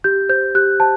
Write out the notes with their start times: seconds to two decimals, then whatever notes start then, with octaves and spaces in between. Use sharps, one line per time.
0.04 G4 G6
0.29 C5 G6
0.55 G4 F#6
0.80 C5 A5